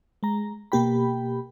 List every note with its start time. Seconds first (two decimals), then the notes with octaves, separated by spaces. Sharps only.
0.23 G#3 A#5
0.72 B2 A#3 G4 G5 B5